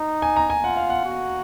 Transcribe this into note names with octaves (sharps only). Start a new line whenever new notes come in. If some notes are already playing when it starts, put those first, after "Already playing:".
Already playing: D#4
G#5
A#5
G#5
F4 F#5
F5
F#5
F#4